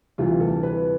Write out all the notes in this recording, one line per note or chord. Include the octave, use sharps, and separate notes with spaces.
D2 C3 E3 G3 F4
A4
B4